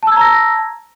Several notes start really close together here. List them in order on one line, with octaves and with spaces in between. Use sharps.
A5 E6 G#6 A#5 A#6